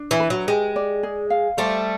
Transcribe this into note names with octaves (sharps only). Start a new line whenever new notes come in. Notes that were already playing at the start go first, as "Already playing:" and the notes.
Already playing: D4
E3
B4
F#3
G#3 G4
D5
G#4
F5
G3 A3 C5